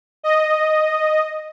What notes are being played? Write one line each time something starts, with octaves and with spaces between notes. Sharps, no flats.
D#5